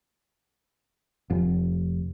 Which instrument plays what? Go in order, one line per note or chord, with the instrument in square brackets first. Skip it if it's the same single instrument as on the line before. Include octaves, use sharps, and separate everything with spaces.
[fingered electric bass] F1